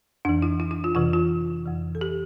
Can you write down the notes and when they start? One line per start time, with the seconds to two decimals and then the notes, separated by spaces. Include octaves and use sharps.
0.25 F2 E3 D4
0.42 E4
0.60 E4
0.71 E4
0.84 F4
0.95 F2 C3 E3 F4
1.13 F4
1.65 F2 E3
1.95 A4
2.01 G4